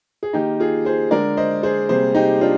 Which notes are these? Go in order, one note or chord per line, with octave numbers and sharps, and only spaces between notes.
G#4
D#3 A#3 D#4 G4
F4 G#4
G#4 C5
D3 G#3 A#4 D5
C5 D#5
G#4 C5
C3 G3 A#3 G#4 C5
D#4 G4
D4 F4